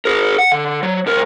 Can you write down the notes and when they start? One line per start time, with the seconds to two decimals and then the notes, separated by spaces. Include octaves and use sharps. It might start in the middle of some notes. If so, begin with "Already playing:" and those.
0.05 G#4 A#4
0.38 F#5
0.52 D3
0.83 F#3
1.06 C#2 A#4